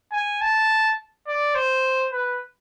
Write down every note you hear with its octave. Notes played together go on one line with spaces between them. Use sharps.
G#5
A5
D5
C5
B4